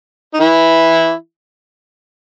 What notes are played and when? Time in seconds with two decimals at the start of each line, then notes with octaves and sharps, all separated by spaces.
0.34 D#4
0.40 E3 E4